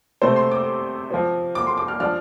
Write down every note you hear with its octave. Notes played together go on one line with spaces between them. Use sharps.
C3 A3 C4 C5
C6
D6
F3 C4
D6
C6
D6
F6
F3 D4 F6